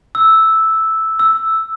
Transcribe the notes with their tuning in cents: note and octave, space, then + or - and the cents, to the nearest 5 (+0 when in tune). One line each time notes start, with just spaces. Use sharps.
E6 -5
E6 +0